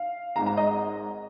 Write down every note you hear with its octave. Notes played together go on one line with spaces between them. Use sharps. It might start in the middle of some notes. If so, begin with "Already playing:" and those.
Already playing: F5
G#1 G#2 G#3 A#5
A#5
D#5